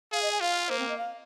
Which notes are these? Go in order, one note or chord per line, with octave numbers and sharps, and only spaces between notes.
G#4 F5
D#5
G#5
F4 F5
A#3 C5
C4
D#5
F5